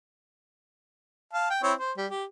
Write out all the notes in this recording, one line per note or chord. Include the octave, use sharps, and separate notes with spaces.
F5 A5
G5
C4 E4 C#5
C5
G3
G4